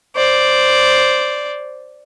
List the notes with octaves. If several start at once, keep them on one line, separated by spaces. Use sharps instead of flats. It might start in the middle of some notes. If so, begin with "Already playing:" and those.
C5 D5